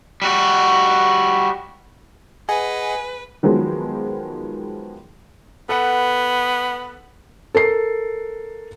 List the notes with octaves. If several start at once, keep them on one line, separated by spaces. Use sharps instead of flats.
G3 F#4
G#4 B4 D#5 F#5 G#5
D#3 F3 F#3 G#3 B3
B3 A4 B4 F#5
A4 A#4 C7